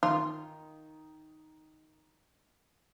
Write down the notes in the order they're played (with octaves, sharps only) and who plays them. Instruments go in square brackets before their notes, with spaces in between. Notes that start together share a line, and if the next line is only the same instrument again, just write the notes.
[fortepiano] D#3 [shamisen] F4